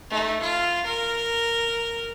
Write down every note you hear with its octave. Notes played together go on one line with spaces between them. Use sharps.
A3 D#4
F4
A#4